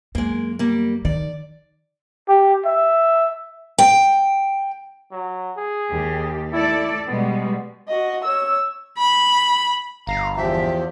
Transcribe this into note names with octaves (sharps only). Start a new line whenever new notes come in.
F#2 G#3 A#3
G3 A#3
D#3 D5
G4
E5
G5
F#3
G#4
D#2 G4
A3 E4 A4 D5
B2 G3 G#3 B3
F#4 D#5
C#5 E6
B5
G1 F5 A#5
E2 F3 G4 E5